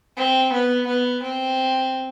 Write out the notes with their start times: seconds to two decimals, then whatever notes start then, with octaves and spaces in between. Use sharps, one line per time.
0.17 C4
0.52 B3
0.87 B3
1.22 C4